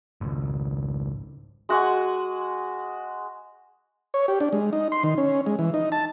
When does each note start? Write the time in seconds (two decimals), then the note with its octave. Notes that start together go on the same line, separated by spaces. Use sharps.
0.21 G#1 C#2
1.69 G#3 F#4 F#5 G#5
4.14 C#5
4.28 G4
4.40 D4
4.53 G#3
4.73 D#4
4.92 C6
5.03 D#3
5.18 C#4
5.46 G#3
5.59 E3
5.74 D#4
5.92 A5